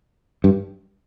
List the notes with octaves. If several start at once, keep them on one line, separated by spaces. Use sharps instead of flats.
G2